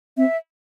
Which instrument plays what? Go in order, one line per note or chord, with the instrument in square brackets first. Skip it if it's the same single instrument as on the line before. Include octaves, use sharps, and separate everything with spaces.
[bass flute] C4 [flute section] E5